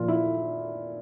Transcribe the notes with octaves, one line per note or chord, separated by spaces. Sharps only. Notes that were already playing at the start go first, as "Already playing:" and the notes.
Already playing: A#2 F3 F4
E4